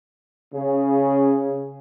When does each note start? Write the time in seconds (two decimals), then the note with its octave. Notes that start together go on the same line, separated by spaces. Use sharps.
0.54 C#3